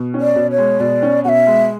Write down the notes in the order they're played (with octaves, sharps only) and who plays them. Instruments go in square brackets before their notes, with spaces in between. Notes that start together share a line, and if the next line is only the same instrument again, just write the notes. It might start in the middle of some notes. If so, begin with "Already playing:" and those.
Already playing: [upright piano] B2
C#4
[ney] D5
[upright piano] B2
[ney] C#5
[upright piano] G#3
[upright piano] B2 [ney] D5
[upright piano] C#4
[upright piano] B2 [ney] E5 F#5
[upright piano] G#3